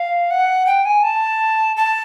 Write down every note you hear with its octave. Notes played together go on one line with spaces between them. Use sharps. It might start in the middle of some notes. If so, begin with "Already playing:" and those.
Already playing: F5
F#5
G5
G#5
A5
A5